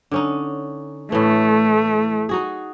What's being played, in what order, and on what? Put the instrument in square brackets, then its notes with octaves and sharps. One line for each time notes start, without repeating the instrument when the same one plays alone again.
[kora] D3 C#4 D#4
[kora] A2 E3 [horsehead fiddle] A3
[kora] D#4 F#4 G#4